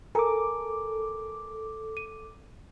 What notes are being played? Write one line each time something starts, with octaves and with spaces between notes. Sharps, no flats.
A4 A#4 G#5 A#5 D6
D#7